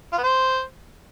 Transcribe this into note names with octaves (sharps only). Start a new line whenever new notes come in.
F4
B3
C5